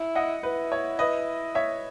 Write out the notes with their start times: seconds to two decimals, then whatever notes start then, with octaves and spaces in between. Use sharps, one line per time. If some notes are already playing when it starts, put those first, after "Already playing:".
Already playing: E4
0.15 D#5 F#5
0.43 E4 B4
0.72 C#5
0.99 B4 D#5
1.55 C#5 E5